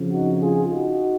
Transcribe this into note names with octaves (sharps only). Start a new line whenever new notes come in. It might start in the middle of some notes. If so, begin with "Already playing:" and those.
Already playing: F2 C#3 F3
D#4 F#4
F4 G#4
D#4 F#4